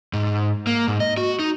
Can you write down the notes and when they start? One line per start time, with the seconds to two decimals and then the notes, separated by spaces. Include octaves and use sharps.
0.13 G#2
0.67 A#3
0.88 G#2
1.00 D#5
1.17 F#4
1.40 D#4